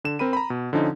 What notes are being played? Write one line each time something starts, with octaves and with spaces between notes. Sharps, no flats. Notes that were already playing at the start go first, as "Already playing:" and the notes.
D3 E7
C4 A#4 B5 D#7
A#5 B5
B2
D3 F3 C#4 D#4